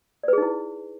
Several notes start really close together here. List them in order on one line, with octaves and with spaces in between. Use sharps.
D5 B4 G#4 D#4 E4